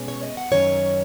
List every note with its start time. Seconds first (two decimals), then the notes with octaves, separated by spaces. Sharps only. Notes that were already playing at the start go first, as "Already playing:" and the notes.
Already playing: B2 G#3 C#4
0.08 C#5
0.23 D#5
0.37 F#5
0.52 F#2 D#3 F#3 C#4 C#5